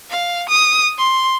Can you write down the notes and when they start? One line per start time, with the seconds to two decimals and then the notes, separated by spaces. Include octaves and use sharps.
0.10 F5
0.49 D#6
0.98 C6